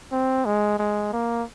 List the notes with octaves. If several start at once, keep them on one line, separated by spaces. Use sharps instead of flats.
C4
G#3
G#3
A#3